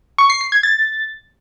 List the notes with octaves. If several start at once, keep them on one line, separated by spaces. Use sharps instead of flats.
C#6
C7
C7
G#6
A6